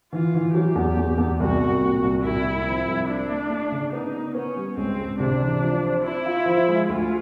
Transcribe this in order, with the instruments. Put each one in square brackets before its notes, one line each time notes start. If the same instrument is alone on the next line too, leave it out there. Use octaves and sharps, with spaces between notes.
[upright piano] E3 [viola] F4
[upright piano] E3
[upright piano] F#3 [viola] G4
[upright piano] E2
E2
E2
[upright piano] C2 [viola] F#4
[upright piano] C2
A#2
C2
[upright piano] C2 [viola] E4
[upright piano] C2
F3
C2
[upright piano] C4 [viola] D4
[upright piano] A3
A3
C#3
[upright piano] B3 [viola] D#4
[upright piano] B3
[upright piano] B3 [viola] C#4
[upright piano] G3
[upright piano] C#2 [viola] C4
[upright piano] C#2
[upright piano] C3 [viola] D4
[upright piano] E3
F3
C4
[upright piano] C4 [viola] E4
[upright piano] F4
F3
G#3
[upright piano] D2 [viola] F4